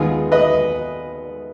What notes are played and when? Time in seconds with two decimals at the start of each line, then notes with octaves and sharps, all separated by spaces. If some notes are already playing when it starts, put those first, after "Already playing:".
Already playing: D#2 D#3 G#3 B3 F4 G#4
0.32 B4 D#5